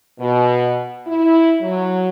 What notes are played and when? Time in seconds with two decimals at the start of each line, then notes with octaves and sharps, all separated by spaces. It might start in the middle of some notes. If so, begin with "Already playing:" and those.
0.20 B2
1.07 E4
1.62 F#3